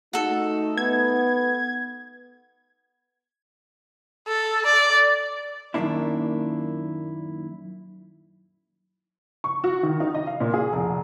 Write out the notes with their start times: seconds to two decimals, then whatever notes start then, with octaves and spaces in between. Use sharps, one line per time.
0.13 A3 D#4 F#4 A4
0.77 B3 G#6
4.28 A4
4.66 D5
5.74 F#2 A#2 D#3 A#3 D4 E4
9.44 C#6
9.64 F#4
9.83 D#3
10.00 D#4
10.14 D#5
10.27 F5
10.40 A#2
10.53 G#4
10.73 F1